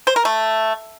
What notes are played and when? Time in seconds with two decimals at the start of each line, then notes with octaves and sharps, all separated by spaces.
0.07 C5
0.16 A#4
0.25 A3